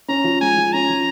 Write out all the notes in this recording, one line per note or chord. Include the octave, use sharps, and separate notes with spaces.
C#4 A#5
F3
G#3 G#5
F3
C#4 A#5
F3